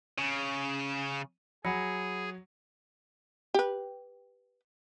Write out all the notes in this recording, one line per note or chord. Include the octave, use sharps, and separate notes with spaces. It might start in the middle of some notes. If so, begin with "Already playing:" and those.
C#3
F#3 G#4 F#5 B5 C#7
G4 B4